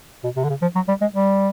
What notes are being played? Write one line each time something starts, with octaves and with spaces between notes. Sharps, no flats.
B2
C3
D3
C#3
F3
F#3
G3
G#3
G3